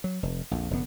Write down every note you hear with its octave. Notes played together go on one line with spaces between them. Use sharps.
F#3
F1
A#1 F2
F1 F#2 D3 B3